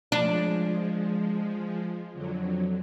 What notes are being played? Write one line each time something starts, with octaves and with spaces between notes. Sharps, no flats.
F3 G#3 D4
F2 D3 F#3